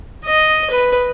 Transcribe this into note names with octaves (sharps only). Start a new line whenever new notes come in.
D#5
B4